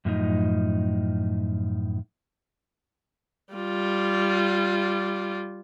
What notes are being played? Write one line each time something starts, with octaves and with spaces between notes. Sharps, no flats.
F#2 A2 F3 D#4
G3 F4